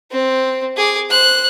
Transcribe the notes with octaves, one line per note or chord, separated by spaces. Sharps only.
C4
G#4 D6
C5 F#6